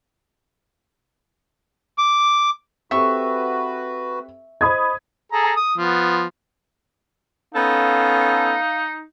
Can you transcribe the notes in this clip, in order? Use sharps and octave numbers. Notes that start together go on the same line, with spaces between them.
D6
C4 F#4 G4 A4 B4 E5 C#6
C5 D#5 B5 D#6 G#6
G#4 A4 A#5
D#6
F3 B3
B3 C#4 D#4 A4 F5